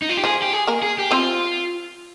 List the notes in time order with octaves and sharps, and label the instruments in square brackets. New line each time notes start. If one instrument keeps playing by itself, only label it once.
[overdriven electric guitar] D#4
F4
G4
[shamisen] F3 F4 [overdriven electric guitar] G#4
[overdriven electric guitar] G4
G#4
[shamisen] A#3 A#4
[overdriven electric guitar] G#4
G4
[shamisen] C4 C5 [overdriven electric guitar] F4